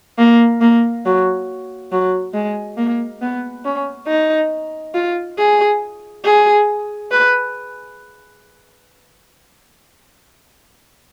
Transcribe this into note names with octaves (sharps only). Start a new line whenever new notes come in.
A#3
A#3
F#3
F#3
G#3
A#3
B3
C#4
D#4
F4
G#4
G#4
B4